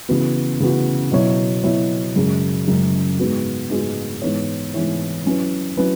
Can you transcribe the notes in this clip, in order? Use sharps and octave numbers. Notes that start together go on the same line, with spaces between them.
C#3 E3 B3 F#4
C#3 E3 B3 F#4
B2 F#3 E4 C#5
B2 F#3 E4 C#5
F#2 C#3 G#3
F#2 C#3 G#3
G#2 G#3 B3 F#4
G#2 G#3 B3 F#4
G#2 E3 B3 E4 C#5
G#2 E3 B3 E4 C#5
F#3 C#4 E4 B4
F#3 C#4 E4 B4